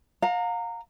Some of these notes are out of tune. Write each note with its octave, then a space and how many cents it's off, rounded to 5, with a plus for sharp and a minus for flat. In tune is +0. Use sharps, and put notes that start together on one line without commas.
F5 +35 A#5 -20